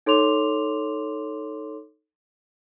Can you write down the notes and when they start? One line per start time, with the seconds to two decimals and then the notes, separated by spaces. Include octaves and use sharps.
0.06 D#4 A4 C#5 C6 D6 F7